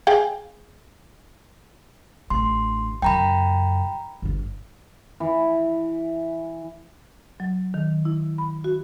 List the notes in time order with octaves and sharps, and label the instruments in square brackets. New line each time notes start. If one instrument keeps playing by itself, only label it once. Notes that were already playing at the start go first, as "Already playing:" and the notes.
[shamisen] G#4 F5 G5
[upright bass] A1 D4 [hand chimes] C6
[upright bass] F#2 C#3 [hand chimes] G5 A#5 B5
[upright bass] G1 D3
[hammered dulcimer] E3
[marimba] F#3
D#3
E4
B5
F#4